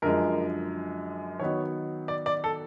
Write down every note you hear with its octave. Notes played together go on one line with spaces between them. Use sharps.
F#2 D3 F3 G#3 A#4
D#3 F#3 B3 D#4 C#5
D5
D5
A4